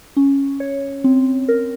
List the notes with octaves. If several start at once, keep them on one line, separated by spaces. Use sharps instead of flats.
C#4
C#5
C4
A#4